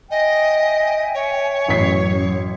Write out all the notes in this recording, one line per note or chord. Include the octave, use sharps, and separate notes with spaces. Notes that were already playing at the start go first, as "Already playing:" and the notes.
D#5 E5 G5 G#5
C#5
A1 F#2 B6 C7